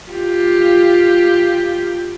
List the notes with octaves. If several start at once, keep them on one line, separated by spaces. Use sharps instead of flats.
F4 G4